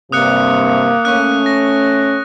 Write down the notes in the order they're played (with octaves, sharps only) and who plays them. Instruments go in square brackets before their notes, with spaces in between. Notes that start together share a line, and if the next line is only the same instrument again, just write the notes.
[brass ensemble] G2 C3 [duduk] A#3 [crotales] D#6 F#6 C#7
[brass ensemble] A3 C#4 [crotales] C#6 F#6
[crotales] A#6